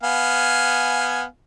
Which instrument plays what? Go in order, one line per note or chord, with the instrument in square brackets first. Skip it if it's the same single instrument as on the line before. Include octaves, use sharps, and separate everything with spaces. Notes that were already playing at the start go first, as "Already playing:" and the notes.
[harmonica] B3 F5 G#5